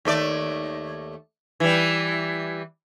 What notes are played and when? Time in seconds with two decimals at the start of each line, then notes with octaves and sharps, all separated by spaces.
0.05 D#2 A3 D5
1.60 E3 G3